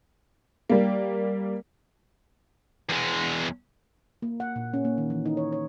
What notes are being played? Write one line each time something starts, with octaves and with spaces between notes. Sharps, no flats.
G3 A#3
E2 G#3
A#3
F#5
A#2
C#4
A#3
D#3
E3
D#4
C#5
C#5